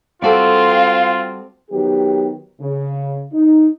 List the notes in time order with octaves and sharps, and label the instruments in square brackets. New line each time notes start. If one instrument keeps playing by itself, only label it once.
[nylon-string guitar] G3 F#4 A4 [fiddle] C4 [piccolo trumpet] F4 [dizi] F5
[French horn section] D#3 F#3 B3 G4
C#3
D#4